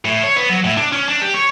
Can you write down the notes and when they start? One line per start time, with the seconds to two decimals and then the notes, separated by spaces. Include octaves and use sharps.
0.05 A2
0.23 C#5
0.36 B3
0.49 F#3
0.64 A2
0.77 D4
0.92 C#4
1.09 D4
1.22 G4
1.34 C#5